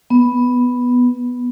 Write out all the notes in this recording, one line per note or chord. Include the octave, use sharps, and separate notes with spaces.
B3